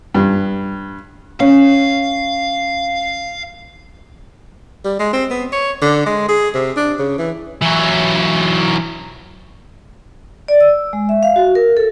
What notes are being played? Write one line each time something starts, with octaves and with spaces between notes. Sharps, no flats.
G2
C#4 F5
G3
G#3
C4
B3
C#5
D3
G#3
G#4
C3
D4
C#3
E3
E3 F#3
D5
E6
G#3
E5
F5
F#4
A#4
A4